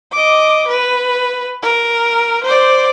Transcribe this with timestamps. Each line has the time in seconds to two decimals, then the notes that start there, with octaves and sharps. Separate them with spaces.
0.12 D#5 D6
0.67 B4
1.63 A#4
2.44 C5 D5